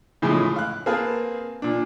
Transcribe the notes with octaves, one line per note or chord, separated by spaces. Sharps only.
A2 C#3 E3 F3 G#3 A3
F5 F#6
A#3 C4 G#4 B4 F5 A5
A#2 D4